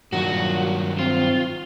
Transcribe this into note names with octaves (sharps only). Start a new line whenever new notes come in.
G2 A#2 D#3 F#3 F#4
C4 F4